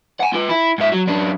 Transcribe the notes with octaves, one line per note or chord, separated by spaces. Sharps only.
F#5 G#5
F4 B4
E4
G#2 E5
F#3
F#2 D4